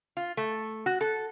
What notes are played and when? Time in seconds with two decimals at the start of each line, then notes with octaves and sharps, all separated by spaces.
0.17 F4
0.37 A3
0.86 F#4
1.01 A4